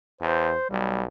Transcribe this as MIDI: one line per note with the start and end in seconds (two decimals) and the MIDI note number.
0.21 0.54 40
0.21 0.67 72
0.70 1.08 35
0.70 1.02 55